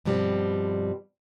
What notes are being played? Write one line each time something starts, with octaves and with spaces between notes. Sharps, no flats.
G2 B2 F3 G3 C4